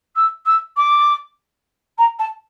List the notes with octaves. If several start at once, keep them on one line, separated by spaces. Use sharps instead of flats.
E6
E6
D6
A#5
A5